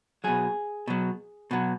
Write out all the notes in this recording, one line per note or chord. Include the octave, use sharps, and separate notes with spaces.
B2 F#3 G#4
B2 F#3
B2 F#3